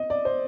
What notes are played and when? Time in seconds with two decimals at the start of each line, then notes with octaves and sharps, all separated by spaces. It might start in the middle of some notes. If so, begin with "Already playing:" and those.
Already playing: D#5
0.10 D5
0.25 C5